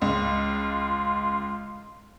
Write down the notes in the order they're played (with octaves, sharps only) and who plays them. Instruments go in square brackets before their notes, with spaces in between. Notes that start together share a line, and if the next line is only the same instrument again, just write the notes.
[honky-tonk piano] C#2 [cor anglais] F4